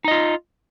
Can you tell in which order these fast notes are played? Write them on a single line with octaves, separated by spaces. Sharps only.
D#4 D#5 F4